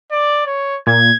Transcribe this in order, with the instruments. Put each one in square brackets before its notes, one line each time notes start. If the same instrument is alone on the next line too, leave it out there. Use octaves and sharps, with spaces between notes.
[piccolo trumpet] D5
C#5
[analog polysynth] A#2 [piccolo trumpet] G#6